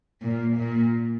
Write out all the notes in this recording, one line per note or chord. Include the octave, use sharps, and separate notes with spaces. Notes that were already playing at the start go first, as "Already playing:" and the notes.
A#2
A#2